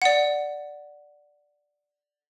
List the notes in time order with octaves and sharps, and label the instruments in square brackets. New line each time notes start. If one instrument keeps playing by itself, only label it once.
[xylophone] D5 F#5